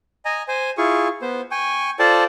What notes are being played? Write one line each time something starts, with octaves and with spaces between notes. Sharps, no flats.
D#5 G#5 A#5
C5 G#5
E4 F4 G#4 C#6
B3 C5
G5 G#5 C#6
F4 A4 C5 D5 G5 A5